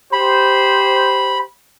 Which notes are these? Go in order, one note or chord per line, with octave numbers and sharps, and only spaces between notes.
G4 C5 B5